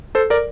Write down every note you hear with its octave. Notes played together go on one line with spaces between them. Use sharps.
A4 C5
A#4 D5